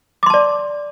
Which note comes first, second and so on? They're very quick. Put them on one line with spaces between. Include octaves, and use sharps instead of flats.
D6 C6 A5 D5